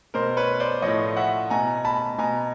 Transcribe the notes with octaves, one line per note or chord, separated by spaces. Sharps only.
B2 A#4 C5
B4 C#5
C5 D5
A2 F3 C#5 D#5
E5 F#5
B2 G#5 A#5
A5 B5
B2 G#5 A#5